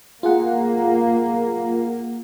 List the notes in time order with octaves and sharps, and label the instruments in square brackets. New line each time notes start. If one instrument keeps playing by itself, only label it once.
[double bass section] A#3 [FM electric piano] F4 G#4 F#5